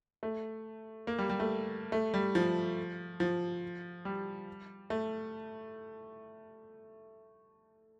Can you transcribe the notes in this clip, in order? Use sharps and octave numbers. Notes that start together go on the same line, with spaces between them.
A3
A#3
G3
G3
A3
A3
G3
F3
F3
G3
A3